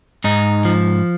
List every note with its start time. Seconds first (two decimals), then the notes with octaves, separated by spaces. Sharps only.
0.24 G#2 D#4
0.65 F3